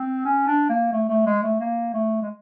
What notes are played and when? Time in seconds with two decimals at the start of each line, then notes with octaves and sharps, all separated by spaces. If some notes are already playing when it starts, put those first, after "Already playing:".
Already playing: C4
0.25 C#4
0.47 D4
0.70 A#3
0.93 A3
1.09 A3
1.26 G#3
1.43 A3
1.60 A#3
1.94 A3
2.22 G#3